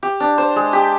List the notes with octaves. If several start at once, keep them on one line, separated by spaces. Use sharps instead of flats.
G4
D4
C5
G#3
G4